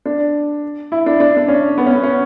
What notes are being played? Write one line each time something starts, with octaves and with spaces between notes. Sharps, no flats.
D4
E4
D4
D4
D4
C#4
B3
C#4
B3
C#4